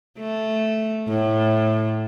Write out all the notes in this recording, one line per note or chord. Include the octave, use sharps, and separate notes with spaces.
A3
A2